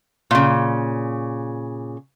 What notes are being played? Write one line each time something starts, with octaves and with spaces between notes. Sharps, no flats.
A#2 C#3